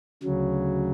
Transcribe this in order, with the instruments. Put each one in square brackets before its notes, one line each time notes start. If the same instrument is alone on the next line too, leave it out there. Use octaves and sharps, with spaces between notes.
[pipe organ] D2 C#3 F#3